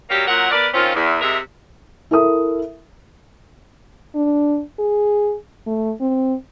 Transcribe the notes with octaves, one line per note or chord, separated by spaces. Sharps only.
F#3 G3 A#3 C#4 G4
A#2 F#3 A#4 F#5
B3 A#4 D5
D#3 C4 C#4 F4
E2
C3 G#3 A#4 E5
E4 A4 A#4 E5 D#6
D4
G#4
A3
C4